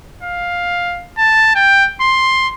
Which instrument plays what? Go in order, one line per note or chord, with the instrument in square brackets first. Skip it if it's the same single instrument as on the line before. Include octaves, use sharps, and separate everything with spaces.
[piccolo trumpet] F5
A5
G5
C6